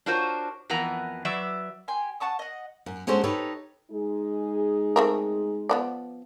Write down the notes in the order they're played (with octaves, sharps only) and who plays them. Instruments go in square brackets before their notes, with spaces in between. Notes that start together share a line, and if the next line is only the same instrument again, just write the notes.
[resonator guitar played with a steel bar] D4 F4 F#4 A#4 C5 C#5
F2 E3 B3 A#4 F#5 A#5
F#3 B4 D5 E5
[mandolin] G4 G5 G#5 C6
F#5 A5 C#6 D#6
D#5 F#5
[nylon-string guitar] F#2
G#3 C#4 D4 F#4 A4 C5
D#4 G4 A4 B4 C#5
[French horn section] G#3 D#4 G#4
[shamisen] A3 C4 A#4
F3 B3 D5